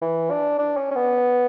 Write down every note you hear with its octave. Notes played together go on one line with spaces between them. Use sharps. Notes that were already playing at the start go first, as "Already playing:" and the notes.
E3
D4
D4
C#4
C#4
B3